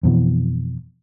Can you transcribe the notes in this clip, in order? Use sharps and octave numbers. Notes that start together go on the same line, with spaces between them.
F2 B2 E3